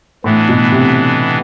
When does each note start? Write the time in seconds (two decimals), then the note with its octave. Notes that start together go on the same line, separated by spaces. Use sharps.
0.24 A2 E3 B3 D4
0.49 B2
0.72 C3